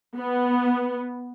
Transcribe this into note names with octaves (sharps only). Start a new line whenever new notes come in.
B3